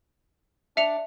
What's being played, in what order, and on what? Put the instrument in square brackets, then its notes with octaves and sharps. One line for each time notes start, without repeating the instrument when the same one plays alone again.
[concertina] D4 [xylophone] E5 C#7 F7